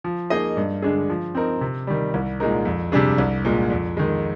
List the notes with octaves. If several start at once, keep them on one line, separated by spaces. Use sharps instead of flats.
F3
A#3 D#4 G#4 D#5
G2
D3 G#3 D4 G#4
F3
C4 D#4 A#4
C3
D#3 G3
C2
A#2 G#3 D#4 A#4
F2
C3 G3 D4 G#4
C2
A#2 G#3
F2
D#3 G#3